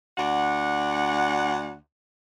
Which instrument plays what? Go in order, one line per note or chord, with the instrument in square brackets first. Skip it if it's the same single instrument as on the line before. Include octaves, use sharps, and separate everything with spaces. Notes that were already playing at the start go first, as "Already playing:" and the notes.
[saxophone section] D2 D4 F#5